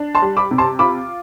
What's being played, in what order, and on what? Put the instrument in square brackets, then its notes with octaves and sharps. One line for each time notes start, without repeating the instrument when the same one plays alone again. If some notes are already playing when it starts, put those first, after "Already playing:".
Already playing: [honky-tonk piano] D4
[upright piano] A5 C6
[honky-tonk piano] G3
[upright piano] B5 D6
[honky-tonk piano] C3
[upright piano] A5 C6
[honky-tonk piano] F4 [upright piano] B5 D6